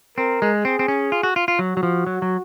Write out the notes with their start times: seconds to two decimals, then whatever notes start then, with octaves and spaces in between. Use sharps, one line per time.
0.18 C4 A#4
0.42 G#3
0.64 C4 G#4
0.79 C4
0.88 C#4
1.12 F4
1.23 F#4
1.36 F4
1.48 F4
1.59 F#3 F#4
1.77 F#3
1.83 F3
2.07 F#3
2.22 F#3